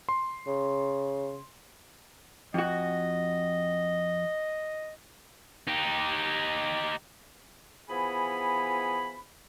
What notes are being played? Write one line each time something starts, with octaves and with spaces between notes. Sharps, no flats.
C6
C#3
F2 F#4 D#5
D#4 G4
E3 F3 B3 G#4 G#5 B5